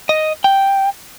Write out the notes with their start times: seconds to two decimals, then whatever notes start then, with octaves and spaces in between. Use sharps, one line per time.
0.09 D#5
0.44 G5